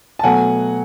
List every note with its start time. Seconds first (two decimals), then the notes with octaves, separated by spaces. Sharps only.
0.19 A5
0.23 B2 F#3 A3 F#5 G#5